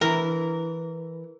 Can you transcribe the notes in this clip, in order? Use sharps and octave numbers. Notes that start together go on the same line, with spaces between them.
E3 A#4